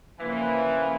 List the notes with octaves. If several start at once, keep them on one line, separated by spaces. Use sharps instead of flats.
C#3 E3 F3 A#3